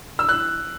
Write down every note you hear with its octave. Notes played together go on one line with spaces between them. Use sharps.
E6
F#6